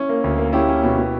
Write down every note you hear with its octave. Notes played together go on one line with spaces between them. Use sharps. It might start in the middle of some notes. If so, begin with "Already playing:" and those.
Already playing: C#4 E4
A#3
D2
A#3
C#4 E4 G4
C#4
B2
B2